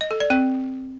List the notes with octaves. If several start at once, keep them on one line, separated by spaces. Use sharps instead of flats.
D#5
A4
D5
C4